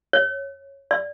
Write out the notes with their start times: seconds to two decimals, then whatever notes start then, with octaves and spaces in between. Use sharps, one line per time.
0.13 C#5
0.91 D5